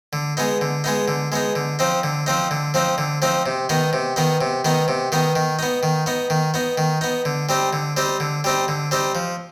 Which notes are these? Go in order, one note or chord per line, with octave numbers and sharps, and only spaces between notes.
D3
G#3 B3 D#4
D3
G#3 B3 D#4
D3
G#3 B3 D#4
D3
F3 C4 D#4
D3
F3 C4 D#4
D3
F3 C4 D#4
D3
F3 C4 D#4
C3
D#3 B3 D#4
C3
D#3 B3 D#4
C3
D#3 B3 D#4
C3
D#3 B3 D#4
D#3
B3 D#4
D#3
B3 D#4
D#3
B3 D#4
D#3
B3 D#4
D3
G3 C4 D#4
D3
G3 C4 D#4
D3
G3 C4 D#4
D3
G3 C4 D#4
F3